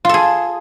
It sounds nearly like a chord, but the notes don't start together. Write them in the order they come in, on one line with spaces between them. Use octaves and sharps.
F4 A4 G#4